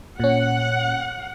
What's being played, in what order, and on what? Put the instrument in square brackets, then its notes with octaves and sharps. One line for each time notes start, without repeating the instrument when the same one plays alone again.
[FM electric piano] A#2 C#4 [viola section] F#5